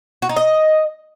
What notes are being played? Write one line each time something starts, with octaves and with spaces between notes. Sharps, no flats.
F#4
D#4
D#5